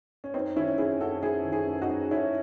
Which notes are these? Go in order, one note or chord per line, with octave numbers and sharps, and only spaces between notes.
C#4
F#2 C4 D#4
D#3 C#4 E4
F#2 E4 G#4
F#2 F#4 A4
F#2 E4 G#4
D#3
E4 G#4
F#2
D#4 F#4
F#2
F#2 C#4 E4